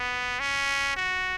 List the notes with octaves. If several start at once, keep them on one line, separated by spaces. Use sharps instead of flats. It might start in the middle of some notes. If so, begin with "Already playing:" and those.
Already playing: B3
C#4
F#4